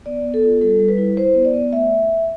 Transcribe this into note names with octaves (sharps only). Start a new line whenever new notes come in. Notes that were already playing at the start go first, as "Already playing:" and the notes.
B3 D5
B3
A4
F4
G3 A4
G3
B4
E4
E4 C5
B3
D5
B3
A3 E5